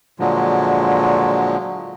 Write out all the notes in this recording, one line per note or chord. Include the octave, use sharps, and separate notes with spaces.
A#2 D3 F3 F#3 G#3